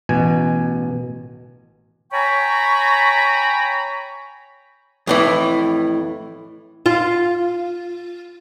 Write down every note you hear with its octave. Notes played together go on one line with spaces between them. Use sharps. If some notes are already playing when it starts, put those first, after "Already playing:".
A1 B2 G#5
C#5 G5 G#5 A#5 B5 C#6
F2 A2 E3
F4